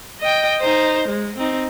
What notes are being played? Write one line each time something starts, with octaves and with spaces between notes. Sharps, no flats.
D#5 G5
D#4 C5
G#3
C4 D#4